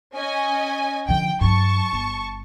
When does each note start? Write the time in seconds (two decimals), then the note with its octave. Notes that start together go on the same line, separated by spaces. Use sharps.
0.14 C#4 D#5 G#5
1.09 D3 F3 G5
1.41 G2 F#3 A5 C#6
1.93 G1